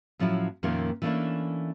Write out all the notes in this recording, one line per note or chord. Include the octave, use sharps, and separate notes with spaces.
A2 F3 F#3 C#4 E4
F2 A#2 D#3 A3 A#3 C#4
E3 A3 A#3 C#4 D4 E4